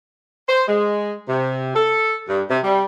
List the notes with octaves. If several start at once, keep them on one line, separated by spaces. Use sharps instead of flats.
C5
G#3
C3
A4
G2
C3
G3